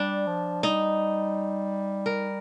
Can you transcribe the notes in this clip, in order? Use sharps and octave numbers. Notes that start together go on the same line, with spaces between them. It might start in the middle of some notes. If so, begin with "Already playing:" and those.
Already playing: G3 D4
F3
G3 D#4
A#4